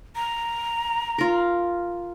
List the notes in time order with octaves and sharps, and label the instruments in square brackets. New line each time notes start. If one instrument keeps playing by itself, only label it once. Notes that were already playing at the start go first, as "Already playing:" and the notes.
[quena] A#5
[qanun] F4 A#4